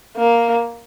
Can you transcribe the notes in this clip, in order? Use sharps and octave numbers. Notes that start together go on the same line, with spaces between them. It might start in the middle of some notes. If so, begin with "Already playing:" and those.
A#3